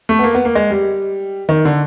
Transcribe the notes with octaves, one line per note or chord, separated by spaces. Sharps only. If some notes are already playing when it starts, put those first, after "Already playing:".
A3
B3
A#3
B3
A#3
G#3
G3
D#3
D3